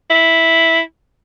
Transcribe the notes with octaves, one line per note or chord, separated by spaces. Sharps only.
E4